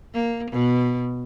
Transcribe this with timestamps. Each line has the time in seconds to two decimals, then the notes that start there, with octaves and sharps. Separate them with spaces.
0.14 A#3
0.51 B2